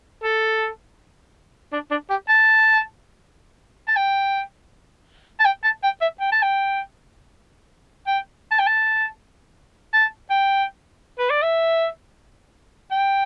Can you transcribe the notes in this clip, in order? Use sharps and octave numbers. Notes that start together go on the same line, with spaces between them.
A4
D4
D4
G4
A5
A5
G5
A5
G5
A5
G5
E5
G5
A5
G5
G5
A5
G5
A5
A5
G5
B4
D5
E5
G5